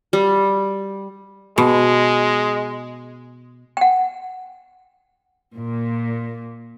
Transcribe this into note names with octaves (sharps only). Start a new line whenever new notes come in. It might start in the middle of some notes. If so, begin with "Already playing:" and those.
G3
B2 G#3
F#5 G5
A#2